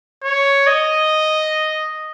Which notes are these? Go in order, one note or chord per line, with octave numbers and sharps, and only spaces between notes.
C#5
D#5